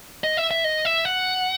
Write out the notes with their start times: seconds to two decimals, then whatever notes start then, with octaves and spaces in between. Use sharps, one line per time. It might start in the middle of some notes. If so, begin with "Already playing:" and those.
0.24 D#5
0.37 E5
0.51 E5
0.64 D#5
0.85 E5
1.05 F#5